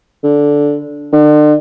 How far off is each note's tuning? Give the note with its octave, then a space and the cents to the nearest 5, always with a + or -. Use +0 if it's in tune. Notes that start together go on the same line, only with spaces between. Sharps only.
D3 -10
D3 +40